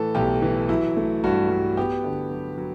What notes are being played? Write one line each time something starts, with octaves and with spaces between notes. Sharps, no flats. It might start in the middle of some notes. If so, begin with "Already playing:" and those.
Already playing: A2 E3 A4
B1 G4
E3
F#3 E4
A3
G2 F#4
G2
B3 G4
D3
F#3
F#3